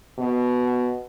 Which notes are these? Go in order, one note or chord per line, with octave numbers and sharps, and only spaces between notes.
B2